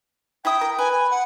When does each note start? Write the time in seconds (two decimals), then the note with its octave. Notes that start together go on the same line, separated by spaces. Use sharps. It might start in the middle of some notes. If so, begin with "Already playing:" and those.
0.45 E4 E5 G5 D#6
0.61 A#4
0.78 B4 G#5
0.92 G#5
1.11 F#5